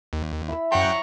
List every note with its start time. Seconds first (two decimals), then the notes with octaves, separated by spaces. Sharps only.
0.13 D#2
0.48 E4 B5 E6
0.72 F#2 C#5 F#5 G5 A#5 C#6